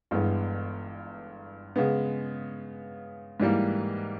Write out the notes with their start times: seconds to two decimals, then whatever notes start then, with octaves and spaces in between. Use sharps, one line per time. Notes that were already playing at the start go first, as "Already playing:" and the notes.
0.11 G1 G2 E3 G#3 B3
1.76 C#3 G#3 B3
3.40 G#2 E3 G3 A#3